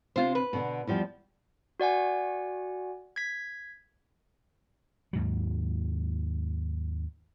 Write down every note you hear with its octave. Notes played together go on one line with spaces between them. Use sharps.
C3 C4 F4 C5
B4
B2 D3 B3
E2 F3 G3
F#4 D5 F#5 G#5
G#6 B6
D#2 G#2 F#3